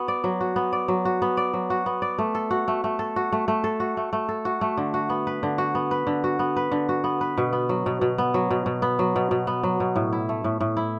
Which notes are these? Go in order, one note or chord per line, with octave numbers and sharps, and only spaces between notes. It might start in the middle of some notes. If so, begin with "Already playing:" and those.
Already playing: B3 F#4
D5
F#3
F#4
B3
D5
F#3
F#4
B3
D5
F#3
F#4
B3
D5
A3
A4
F#4
A3
A3
A4
F#4
A3
A3
A4
F#4
A3
A3
A4
F#4
A3
D3
F#4
B3
B4
D3
F#4
B3
B4
D3
F#4
B3
B4
D3
F#4
B3
B4
B2
B3
F#3
B2
B2
B3
F#3
B2
B2
B3
F#3
B2
B2
B3
F#3
B2
A2
E4
A3
A2
A2
E4